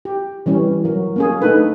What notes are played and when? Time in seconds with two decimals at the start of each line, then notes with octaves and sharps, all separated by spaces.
0.05 G4
0.46 E3 G3 C#4
0.84 F#3 A#4
1.16 A#3 C#4 G#4
1.42 A3 D4 D#4 A4 B4